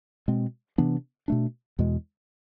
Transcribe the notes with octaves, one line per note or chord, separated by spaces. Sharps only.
B2 G#3 C4
C3 E3 B3 D4
B2 A3 D4
E2 B2 G#3